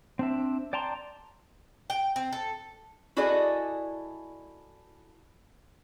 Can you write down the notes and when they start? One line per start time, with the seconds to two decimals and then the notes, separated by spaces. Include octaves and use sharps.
0.19 C4 D4 E5
0.73 D5 G5 A5 A#5 C6
1.90 G5
2.16 C4
2.33 A4
3.17 E4 F#4 G#4 A4 D5 D#5